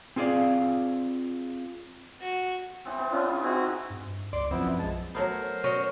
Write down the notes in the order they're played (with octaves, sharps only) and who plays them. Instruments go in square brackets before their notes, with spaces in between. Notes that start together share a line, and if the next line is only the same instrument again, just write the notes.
[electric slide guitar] C4 F4 G#4 A4 D5 F5
[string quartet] F#4
[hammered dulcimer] E3 B3 C4
B3
[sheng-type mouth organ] C#4 D4 F4
[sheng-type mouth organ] E4 [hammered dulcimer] F4 G#4
[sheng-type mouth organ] C4 F#4 G#4 [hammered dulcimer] D#4 E4
[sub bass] G2
[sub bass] C#2 [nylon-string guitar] D5 [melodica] C6 D6
[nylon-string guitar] F#2 F3 C4 [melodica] B3 E4
[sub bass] B1
[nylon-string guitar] G#3 [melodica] A5
[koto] F#3 A3 B3 [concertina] A#4 C5
[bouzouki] C#4 [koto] F#4 D5 D#5